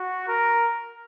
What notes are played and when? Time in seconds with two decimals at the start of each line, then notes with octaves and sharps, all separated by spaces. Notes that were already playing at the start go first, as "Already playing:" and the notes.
Already playing: F#4
0.28 A#4